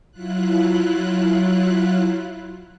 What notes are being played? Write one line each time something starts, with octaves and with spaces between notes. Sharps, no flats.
F#3 E4 F4 F#6